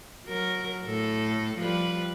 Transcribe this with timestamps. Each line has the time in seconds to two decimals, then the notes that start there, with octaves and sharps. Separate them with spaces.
0.25 F#3 A#4
0.85 A2 A4
1.58 F3 G3 B4